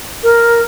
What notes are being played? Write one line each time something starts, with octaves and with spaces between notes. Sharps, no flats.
A#4